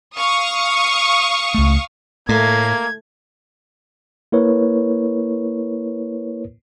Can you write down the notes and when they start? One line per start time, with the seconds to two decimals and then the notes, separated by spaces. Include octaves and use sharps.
0.16 F5 C#6 D#6
1.54 C#2 A3
2.29 A2 A3 A#3 G#6
4.32 A#3 E4 A#4 B4 C#5